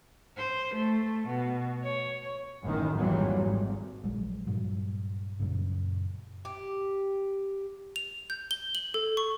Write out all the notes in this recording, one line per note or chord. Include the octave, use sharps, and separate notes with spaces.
C5
A3
B2
C#5
A1 F#2 A2 D#3
G#1 F2 A#2 E3 F#3 G3
G#1
A#1 F#3 G#3
G2 A#2 F#3
F#2 A#2 C#3
G4
F7
G6
G7
F#7
A4
C#6